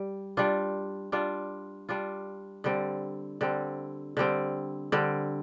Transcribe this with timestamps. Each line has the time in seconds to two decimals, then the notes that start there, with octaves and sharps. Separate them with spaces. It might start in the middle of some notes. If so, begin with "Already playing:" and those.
Already playing: G3
0.37 G3 D4 F4
1.12 G3 D4 F4
1.89 G3 D4 F4
2.64 D3 G3 C4
3.41 D3 G3 C4
4.17 D3 G3 C4
4.92 D3 G3 C4